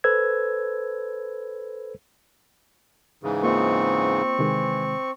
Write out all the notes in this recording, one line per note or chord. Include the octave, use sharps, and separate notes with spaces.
A4 B4 C5 E6 G#6
G#2 C#3 E3
A#3 C4 F4 D#5 C#6
C3 D#3 E3 G#3